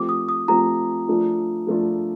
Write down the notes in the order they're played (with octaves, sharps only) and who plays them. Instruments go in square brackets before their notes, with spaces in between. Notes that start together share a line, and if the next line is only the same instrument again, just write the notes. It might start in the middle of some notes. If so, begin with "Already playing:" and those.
Already playing: [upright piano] F3 A3 C4 G4 [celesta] D6
[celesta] D#6
D#6
[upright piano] F3 A3 C4 G4 [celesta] A#5
[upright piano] F3 A3 D4 F4
F3 A3 D4 F4